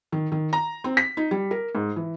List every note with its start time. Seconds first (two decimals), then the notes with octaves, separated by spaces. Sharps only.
0.12 D#3
0.32 D#3
0.53 A#5
0.84 C4
0.97 B6
1.17 D#4
1.31 G3
1.51 A#4
1.75 G#2
1.96 E3